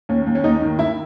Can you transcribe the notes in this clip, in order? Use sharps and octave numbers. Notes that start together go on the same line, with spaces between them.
D#2 C#4
D#2
C#4
D#2 D#4
D#3
D#3 E4